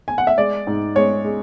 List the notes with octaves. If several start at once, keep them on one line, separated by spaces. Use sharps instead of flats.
G#5
F#5
E5
G#3 D5
G#2
G#3 C#5
G#3